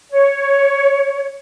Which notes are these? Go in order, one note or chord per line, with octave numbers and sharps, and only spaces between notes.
C#5